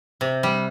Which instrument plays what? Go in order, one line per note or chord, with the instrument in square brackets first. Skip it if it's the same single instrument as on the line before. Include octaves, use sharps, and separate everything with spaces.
[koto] C3
G3